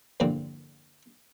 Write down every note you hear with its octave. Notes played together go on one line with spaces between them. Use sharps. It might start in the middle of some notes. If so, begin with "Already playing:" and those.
E2 G2 A#2 D3 F3 C4